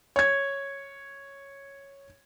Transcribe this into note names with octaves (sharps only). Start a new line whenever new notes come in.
C#5 G#6